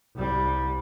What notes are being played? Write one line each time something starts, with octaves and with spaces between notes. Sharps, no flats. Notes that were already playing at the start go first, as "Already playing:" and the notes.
C2 G3